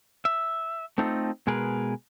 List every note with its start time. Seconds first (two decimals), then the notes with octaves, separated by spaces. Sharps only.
0.25 E5
0.98 A3 C4 D#4 F4 A4
1.47 B2 G#3 G#4 A#4 B4